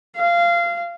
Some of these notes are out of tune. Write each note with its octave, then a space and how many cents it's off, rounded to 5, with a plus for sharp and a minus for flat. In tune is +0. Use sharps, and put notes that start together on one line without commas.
F5 -20